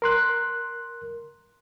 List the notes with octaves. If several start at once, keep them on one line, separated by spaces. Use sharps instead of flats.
A#4 C6 F#6